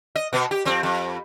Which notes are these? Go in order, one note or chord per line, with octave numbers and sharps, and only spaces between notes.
D#5
B2 B3
G4
F2 C4
F2